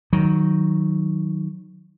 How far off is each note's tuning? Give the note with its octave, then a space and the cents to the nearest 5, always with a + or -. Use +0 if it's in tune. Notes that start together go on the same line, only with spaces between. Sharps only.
D#3 +5 F#3 +0